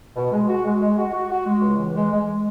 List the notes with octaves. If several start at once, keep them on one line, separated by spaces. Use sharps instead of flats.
B2
G#3
F#4
G#3
G#3
F#4
F#4
F#4
G#3
C#2
E3
G#3
G#3
G#3